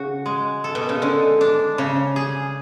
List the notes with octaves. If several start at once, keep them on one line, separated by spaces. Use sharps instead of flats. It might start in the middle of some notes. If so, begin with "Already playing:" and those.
Already playing: C#3 F#4
G#3
A4
B2
C#3
D3 G#3
D4
C#3
G#4